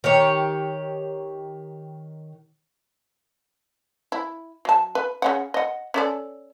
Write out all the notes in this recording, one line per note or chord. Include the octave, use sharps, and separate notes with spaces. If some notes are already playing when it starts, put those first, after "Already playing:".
D#3 G4 C#5
E4
F#3 A5
B4
C#3 C#4 F#5
D#5 F#5
C#4 A4 D5